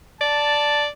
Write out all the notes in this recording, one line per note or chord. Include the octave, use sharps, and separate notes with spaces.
D5 A5